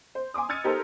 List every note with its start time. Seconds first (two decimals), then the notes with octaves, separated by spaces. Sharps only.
0.15 C5
0.34 G#5 C6 D6 D#6
0.49 E6 F6 G#6 A6 C#7 D#7
0.64 D#4 G4 A4 A#4 C5